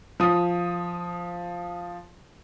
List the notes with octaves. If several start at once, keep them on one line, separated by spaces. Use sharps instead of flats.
F3 D#6